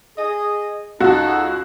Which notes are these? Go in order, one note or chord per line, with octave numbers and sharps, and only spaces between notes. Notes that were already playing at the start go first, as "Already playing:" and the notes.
G#4 D#5
C#2 D#4 F#4 A4